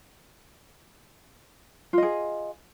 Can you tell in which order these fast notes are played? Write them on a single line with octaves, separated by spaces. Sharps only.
F4 D#5 G#4